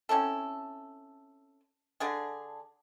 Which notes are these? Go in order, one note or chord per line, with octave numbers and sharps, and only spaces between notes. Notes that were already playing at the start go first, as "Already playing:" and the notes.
C4 C#4 E4 A4
D3 D4 G#4